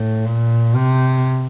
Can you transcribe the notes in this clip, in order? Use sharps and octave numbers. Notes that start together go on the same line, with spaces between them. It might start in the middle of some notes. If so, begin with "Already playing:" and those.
Already playing: A2
A#2
C3